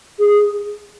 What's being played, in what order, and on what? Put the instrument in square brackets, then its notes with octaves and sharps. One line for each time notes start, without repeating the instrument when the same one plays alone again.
[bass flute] G#4